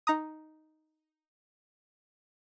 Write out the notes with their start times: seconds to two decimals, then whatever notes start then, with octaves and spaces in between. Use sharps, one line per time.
0.07 D#4 A#5 D#6